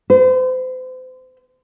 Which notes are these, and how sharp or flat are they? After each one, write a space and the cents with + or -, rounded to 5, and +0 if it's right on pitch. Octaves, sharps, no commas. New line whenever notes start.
C5 -35